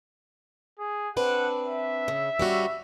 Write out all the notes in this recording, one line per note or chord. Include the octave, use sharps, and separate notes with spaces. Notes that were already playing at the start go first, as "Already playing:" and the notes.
G#4
C4 D4 B4 F#5
E5
C#3
G3 C#4 F#4